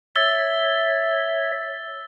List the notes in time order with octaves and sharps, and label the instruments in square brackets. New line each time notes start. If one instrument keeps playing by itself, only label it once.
[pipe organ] C#5 E5 [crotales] E6 A6 G7